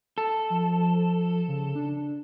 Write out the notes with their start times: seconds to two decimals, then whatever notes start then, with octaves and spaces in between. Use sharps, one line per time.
0.18 A4
0.50 F3
1.48 C#3
1.75 D4